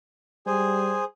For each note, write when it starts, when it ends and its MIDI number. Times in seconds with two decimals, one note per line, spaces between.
0.47 1.00 55
0.47 1.04 68
0.47 1.04 72
0.47 1.04 80